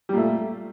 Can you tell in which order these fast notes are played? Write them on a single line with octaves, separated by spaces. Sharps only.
G3 A#2 A3